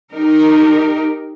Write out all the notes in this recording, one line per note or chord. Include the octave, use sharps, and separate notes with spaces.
D#4 G4 A#4